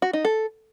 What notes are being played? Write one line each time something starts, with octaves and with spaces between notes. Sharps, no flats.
F#4
D#4
A4